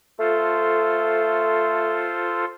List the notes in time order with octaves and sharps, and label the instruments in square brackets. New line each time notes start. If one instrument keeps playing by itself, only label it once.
[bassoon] A3 [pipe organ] F4 A4 C5